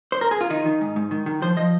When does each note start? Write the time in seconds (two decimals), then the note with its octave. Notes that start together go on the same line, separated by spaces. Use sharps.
0.12 C5
0.21 A#4
0.31 G#4
0.41 F4
0.50 D#3 D#4
0.66 D#3
0.81 G#2
0.96 G#2
1.11 D#3
1.26 D#3
1.42 F3 C5
1.57 F3 D#5